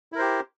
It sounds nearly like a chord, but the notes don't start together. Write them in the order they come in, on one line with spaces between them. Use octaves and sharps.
E4 A#4 C5 G4